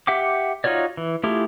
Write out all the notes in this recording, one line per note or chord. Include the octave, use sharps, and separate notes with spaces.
G4 E5 F#5 G5 D6
D#4 F4 F#4 C#5 D5
E3
A3 E4 F4 G4 G#4